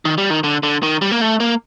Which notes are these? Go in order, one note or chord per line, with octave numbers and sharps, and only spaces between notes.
D#3
G3
D#3
D3
D3
D#3
G3
A#3
A3
A#3